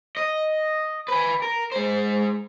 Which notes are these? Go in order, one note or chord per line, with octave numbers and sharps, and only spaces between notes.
D#5
B4 G#5
A#4
G#3 C5